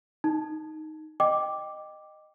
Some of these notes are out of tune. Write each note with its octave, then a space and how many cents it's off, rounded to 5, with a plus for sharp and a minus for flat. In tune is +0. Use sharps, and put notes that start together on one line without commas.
D#4 +0 A5 +0
D#5 -15 G5 +0 D6 +0